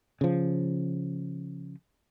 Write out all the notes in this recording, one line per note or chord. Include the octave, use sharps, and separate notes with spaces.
C#3 F3